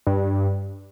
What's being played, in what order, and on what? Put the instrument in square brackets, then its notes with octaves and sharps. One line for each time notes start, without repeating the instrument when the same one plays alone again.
[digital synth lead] G2